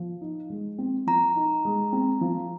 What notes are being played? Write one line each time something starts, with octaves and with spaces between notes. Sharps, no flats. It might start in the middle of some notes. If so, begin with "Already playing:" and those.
Already playing: F3
D#4
G#3
C4
F3 A#5
D#4
G#3
C4
F3